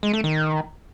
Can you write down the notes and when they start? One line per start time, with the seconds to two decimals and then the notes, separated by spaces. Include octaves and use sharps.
0.03 G#3
0.13 A3
0.24 D#3